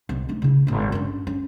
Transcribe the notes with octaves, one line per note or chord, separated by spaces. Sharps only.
C2
A3 D#4
C#3 E4
G#1 G#2
G2 C#4
C#4